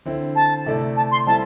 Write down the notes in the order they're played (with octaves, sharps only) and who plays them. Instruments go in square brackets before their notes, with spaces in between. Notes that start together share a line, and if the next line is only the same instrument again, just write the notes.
[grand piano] D3 C4 E4
[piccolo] A5
[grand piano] C3 A3 E4 A4 D5
[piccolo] A5
C6
[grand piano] G3 C4 E4 A4 [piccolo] A5